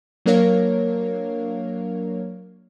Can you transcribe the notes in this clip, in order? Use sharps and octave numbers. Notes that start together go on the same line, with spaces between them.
F#3 A#3 D4 A#4 C#5 F5